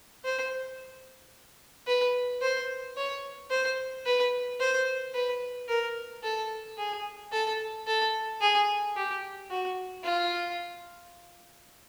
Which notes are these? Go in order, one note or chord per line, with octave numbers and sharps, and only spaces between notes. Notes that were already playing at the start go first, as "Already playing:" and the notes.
C5
B4
C5
C#5
C5
B4
C5
B4
A#4
A4
G#4
A4
A4
G#4
G4
F#4
F4